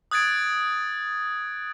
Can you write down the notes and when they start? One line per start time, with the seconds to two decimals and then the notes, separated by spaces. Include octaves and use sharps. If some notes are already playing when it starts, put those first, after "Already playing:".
0.11 D#6 F#6 G#6 A6 D7